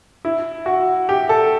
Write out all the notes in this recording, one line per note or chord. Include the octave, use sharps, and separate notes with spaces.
E4
F#4
G4
A4